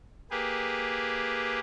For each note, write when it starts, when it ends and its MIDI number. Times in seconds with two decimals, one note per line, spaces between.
0.31 1.59 58
0.31 1.59 67
0.31 1.59 68
0.31 1.59 71